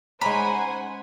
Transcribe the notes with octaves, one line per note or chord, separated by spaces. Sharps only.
G#3 C#4 D#4 C5 F#5 G#5 A#5 B5